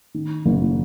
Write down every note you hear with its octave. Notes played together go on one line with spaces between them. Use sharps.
D#3
F#1